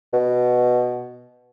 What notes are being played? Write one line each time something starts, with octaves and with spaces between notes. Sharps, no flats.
B2